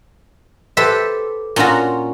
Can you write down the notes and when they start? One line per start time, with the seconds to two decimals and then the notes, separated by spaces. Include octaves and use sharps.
0.77 G4 A4 B4 C5 E5
1.56 A#2 C#4 D4 F4 F#4 A#5